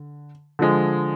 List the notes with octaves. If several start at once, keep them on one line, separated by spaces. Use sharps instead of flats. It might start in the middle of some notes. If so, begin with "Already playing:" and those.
Already playing: D3
D3 F3 G#3